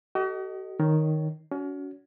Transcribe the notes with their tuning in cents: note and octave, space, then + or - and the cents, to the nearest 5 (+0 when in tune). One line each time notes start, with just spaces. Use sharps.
F#4 +45 A4 +0 D#5 +0
D#3 +0 C#5 +0
C#4 +35 F#4 +0